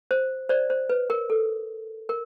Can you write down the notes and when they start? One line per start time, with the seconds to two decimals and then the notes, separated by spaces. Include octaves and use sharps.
0.11 C5
0.49 C5 D5
0.70 C5
0.89 B4
1.10 A#4
1.30 A4
2.09 A#4